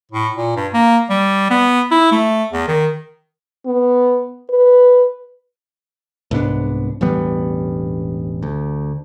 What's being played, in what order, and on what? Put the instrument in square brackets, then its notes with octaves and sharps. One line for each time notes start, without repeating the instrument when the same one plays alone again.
[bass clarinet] A2
A#2
G2
A#3
G3
B3
E4
A3
E2
D#3
[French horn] B3
B4
[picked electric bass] C2 G#2 B3 D4
E1 A1 G3 B3
D2